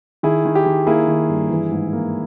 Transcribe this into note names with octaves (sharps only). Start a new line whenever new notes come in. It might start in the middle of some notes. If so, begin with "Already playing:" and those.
D#3 E4 G#4
D#3
G4
D#3
A#3 E4 G#4
D#3
G2
E3
G#2
A#3